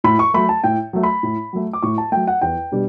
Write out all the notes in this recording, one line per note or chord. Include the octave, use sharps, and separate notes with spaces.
A2 B5
C#6
F#3 A3 B5
A5
A2 G5
F#3 A3
B5
A2
F#3 A3
D6
A2 C#6
A5
F#3 A3 G5
F#5
E2 G5
B2 G3 D4